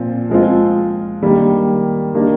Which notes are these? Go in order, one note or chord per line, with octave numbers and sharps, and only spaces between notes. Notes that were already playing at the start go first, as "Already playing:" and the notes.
Already playing: A#2 F3 C4 F4
F3 G#3 C4 F4
D#3 G3 A#3
D#3 A#3 D4 G4